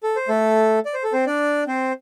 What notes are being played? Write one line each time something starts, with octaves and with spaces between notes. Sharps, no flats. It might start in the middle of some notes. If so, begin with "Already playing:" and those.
A4
C5
A3 A4
D5
C5
A4
C4 C5
D4 D5
C4 C5